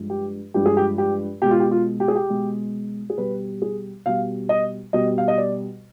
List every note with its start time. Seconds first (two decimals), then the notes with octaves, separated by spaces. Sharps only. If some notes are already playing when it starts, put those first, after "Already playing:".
Already playing: G2 F3 G#3
0.10 G4
0.54 G2 F3 G#3 G4
0.66 G#4
0.77 G4
0.98 G4
1.42 B2 G#3 G4
1.51 F4
1.60 G4
1.71 F4
2.00 G4
2.08 G#4
2.15 G4
2.30 B2 G#3
3.10 G#4
3.17 B2 G3 B4
3.62 G#4
4.06 B2 G3 F5
4.49 D#5
4.93 B2 G3 D#5
5.18 F5
5.28 D#5
5.38 D5